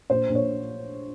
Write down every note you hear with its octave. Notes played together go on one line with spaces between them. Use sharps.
A#1 C5
A#1
C#5